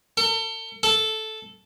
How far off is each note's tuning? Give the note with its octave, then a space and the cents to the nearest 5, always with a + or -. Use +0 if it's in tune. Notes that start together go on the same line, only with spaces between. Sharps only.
A4 +40
A4 -5